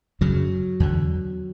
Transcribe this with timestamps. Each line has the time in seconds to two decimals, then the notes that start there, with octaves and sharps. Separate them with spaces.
0.21 F#2 C#3 F#3
0.80 E2 D3